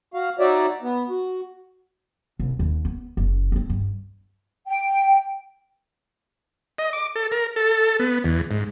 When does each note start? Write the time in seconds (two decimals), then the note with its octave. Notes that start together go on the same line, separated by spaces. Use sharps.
0.14 F#4 F5
0.39 D#4 F#4 C#5 D5 E5
0.82 B3
1.10 F#4
2.40 C2
2.59 D#2
2.85 B3
3.17 F#1
3.52 C4 D4
3.70 G2
4.67 G5
6.78 D#5
6.93 D6
7.16 A4
7.32 A#4
7.56 A4
8.00 B3
8.24 E2
8.51 G#2